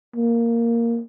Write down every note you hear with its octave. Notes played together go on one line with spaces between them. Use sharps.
A#3